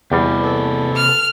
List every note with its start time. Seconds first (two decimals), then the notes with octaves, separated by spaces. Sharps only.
0.12 E2 C3 G3 B4
0.44 A4
0.96 F6